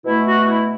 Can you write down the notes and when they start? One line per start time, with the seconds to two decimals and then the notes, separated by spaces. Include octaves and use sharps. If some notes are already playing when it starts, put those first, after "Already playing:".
0.05 B2 A3 E4
0.26 F#4
0.43 F#4
0.48 E4